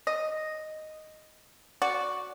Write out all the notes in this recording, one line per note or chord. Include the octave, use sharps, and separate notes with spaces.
D#5
F#4 D5